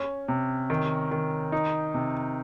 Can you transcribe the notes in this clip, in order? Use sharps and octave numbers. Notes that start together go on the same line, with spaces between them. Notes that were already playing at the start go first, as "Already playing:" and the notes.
Already playing: C#4
C3
D#3
D#3
D#4
C3